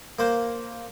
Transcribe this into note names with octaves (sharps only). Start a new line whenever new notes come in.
A#3 C5